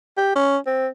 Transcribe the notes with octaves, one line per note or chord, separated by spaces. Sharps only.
G4
C#4
C4